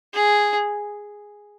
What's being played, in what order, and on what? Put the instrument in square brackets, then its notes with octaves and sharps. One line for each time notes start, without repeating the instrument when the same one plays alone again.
[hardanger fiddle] G#4